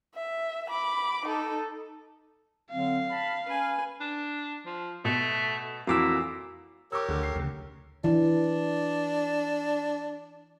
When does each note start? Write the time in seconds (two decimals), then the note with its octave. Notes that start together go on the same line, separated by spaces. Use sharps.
0.15 E5
0.70 B5 D6
1.26 D#4 A4
2.71 D3 F#3 C4 F5
3.10 A5 B5
3.46 C#4 B4 G#5
4.00 D4
4.66 F3
5.05 B2 A3
5.87 F2 A#2 E3 F#4 D6 E6
6.92 G4 A#4 C#5 D6 E6
7.09 D2 D3
7.23 C7
7.36 D2 C#3
8.04 E3 D4